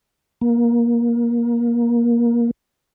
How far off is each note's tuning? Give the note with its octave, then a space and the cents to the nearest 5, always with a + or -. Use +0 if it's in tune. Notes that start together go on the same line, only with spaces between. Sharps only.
A#3 +20